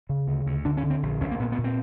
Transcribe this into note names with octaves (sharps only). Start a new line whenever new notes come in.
C#3
D2
D2
D3 D4
C#4
D3
C4
A#1
A#1 C#4
A#3
A#2 B3
B3
A#2
C4